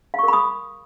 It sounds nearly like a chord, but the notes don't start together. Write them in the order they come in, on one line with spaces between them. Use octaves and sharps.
F5 C#6 A#4 B5 D#6